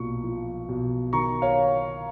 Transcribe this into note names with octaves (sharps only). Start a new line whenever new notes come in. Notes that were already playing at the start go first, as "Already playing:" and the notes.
Already playing: B1 A#2 C#6
F3
B1
D#3 A#5 C#6
C#5 F5